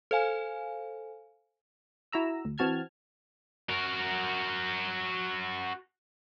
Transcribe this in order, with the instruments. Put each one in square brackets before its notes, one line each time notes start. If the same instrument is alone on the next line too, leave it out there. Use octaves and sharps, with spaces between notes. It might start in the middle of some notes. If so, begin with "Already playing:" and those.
[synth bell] A4 C5 F5 G#5
[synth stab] E4 F#4 A#5 E6
D2
E3 C4 F#4 A5 F6 G#6
[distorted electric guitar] F#4 A#4